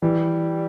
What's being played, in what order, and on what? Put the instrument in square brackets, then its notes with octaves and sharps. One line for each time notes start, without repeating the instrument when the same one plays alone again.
[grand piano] E3 [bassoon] G3